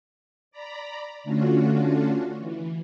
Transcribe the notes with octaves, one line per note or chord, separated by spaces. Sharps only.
D5 A#5 B5
D3 A3 C#4 D4 F4 F#4
E3